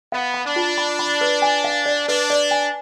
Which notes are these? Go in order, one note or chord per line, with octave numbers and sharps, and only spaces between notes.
B3 F5
B5
D4
F4
B5
B5
B4
G#5
F5
D5
D4 B4
D5
G#5